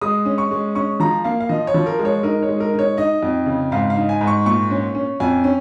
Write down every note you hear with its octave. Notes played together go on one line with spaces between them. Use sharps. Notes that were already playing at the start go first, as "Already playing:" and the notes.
G#3 D#6
C#4
C#6
G#3
C#4 C#6
F3 A#5
A#3 F5
F5
F3 D#5
C#5
F3
A#4
G#3
C#5
D#4 A#4
C#5
G#3
A#4
D#4
C#5
D#4 D#5
F2
C#3
G#2 F5
F5
D#4
G#5
G#2
C#6
A#2 C#6
C#4
C#4
F2 G#5
C#4